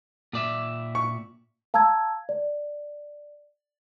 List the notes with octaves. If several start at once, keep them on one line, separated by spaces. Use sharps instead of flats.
A#2 D5 E5
C#6
F5 A5 A#5 E6 G#6
D5